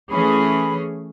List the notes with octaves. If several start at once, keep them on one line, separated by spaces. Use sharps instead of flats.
E3 A3 C#4 G#4 B5